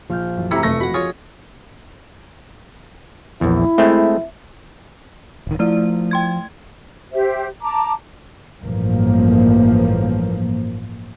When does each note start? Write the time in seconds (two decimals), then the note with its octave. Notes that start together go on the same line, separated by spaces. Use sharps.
0.10 A#1 F3 F6 G6
0.37 F#2 E3
0.51 C3 A3 E4 A#5 C#7
0.63 F1 F3 A3 D#5 A#6
0.81 F#4 F#5 B5 G#6
0.94 F4 G#4 C#5
3.41 A#1 E2 E4
3.78 G#3 A3 C4 E5
5.47 D1 D#3
5.59 F3 A3 E4 D5
6.11 G5 C6 G#6
7.13 G4 C5 E5
7.62 A5 A#5 D6
8.63 A1 G2 F3 A#3